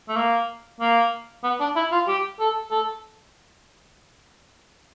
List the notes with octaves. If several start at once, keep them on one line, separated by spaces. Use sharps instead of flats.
A3
A#3
A#3
B3
D4
E4
F4
G4
A4
A4